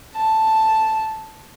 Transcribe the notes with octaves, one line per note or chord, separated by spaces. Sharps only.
A5